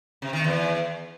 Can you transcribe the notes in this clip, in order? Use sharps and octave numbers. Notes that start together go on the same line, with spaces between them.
C3
D#3
E2